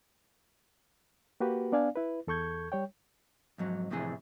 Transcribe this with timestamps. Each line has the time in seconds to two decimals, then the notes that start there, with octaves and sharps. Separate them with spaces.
1.40 A#3 F#4 G4 B4
1.72 B3 D4 D5 F5 G#5
1.95 E4 B4
2.27 E2 A4 C#6 G6 G#6
2.72 G3 C#5 G5
3.58 F2 G#2 F#3
3.90 F2 A2 C3 E3 G#4